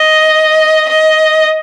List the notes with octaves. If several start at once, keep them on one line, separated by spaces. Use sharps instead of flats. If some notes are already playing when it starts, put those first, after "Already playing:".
Already playing: D#5
D#5